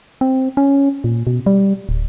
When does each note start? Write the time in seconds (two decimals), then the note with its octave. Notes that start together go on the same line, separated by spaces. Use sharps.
0.21 C4
0.57 C#4
1.04 A#2
1.27 B2
1.46 G3
1.89 D1